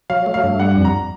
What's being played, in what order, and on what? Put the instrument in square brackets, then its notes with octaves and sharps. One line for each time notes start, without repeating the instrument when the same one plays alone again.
[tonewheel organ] F#3 [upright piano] F5
[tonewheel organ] A3
[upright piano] F5
[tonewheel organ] G2
[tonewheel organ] G3 [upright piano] F#5
[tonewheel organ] F2
[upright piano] A#5